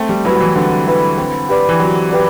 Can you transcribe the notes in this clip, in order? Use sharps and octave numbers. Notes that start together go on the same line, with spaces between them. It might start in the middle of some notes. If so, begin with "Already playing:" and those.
Already playing: A3 C4
G3
F#3 E4 B4
F#3
E3
D3 C4
E4 B4
C4
G4 B4 D5
E3
F#3 C4
G4 B4 D5